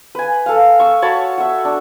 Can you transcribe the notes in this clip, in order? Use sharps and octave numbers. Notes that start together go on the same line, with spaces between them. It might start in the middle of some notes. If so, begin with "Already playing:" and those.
B4 G#5
A4 F5
C#6 E6
F#4 C#5 A5 B5
F#4 E5
D4